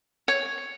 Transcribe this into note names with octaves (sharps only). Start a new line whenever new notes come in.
C#5